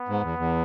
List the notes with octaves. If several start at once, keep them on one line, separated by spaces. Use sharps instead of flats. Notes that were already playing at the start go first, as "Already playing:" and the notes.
Already playing: B3
G#2
E2
E2